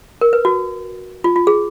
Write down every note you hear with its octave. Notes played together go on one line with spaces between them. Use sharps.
A#4
B4
F#4
F4
F4
G#4